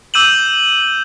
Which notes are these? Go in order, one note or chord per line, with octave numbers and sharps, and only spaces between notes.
D6 E6 G6 D#7 E7 F#7